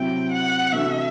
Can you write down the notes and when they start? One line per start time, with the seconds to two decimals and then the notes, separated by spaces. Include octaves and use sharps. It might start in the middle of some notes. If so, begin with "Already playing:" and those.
Already playing: C3 F#3 C4 E4 G5
0.32 F#5
0.72 C3 E3 A3 D4 F#4 E5